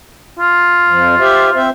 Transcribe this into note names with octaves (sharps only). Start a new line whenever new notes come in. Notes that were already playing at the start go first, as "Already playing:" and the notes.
F4
F2 F3
G4 C5 E5
C4 C5 E5